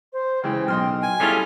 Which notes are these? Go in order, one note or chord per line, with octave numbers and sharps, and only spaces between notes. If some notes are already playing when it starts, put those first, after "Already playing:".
C5
C#3 E3 G#3 G5
B1 D#5 G5 C6 F6
G#5
G3 C#4 E4 F4 G#4 A4